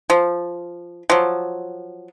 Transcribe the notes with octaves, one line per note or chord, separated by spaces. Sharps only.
F3
F3 F#3